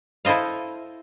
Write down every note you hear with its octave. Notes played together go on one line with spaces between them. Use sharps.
E4 A4 C5 D#5 F5